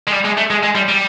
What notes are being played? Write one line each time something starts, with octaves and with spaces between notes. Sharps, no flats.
G#3
G3
G#3
A3
G#3
G#3
G3
G3